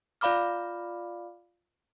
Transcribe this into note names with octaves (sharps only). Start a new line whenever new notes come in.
F4 D5 F5 B5 D6 F6